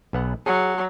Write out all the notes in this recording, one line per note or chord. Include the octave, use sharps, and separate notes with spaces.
B1 B3 F#5
F#3 G#4